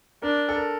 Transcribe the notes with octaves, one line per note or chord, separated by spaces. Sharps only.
D4 A#4
A4
A#4